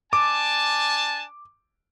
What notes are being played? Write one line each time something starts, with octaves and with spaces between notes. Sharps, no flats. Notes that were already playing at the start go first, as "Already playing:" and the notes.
D4 G#5 A5 D6